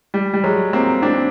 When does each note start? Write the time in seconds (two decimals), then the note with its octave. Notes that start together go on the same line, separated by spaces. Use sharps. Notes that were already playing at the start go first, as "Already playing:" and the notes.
0.14 G3
0.33 G3
0.44 F#3 G#3
0.73 A#3 C4
1.02 C4 D4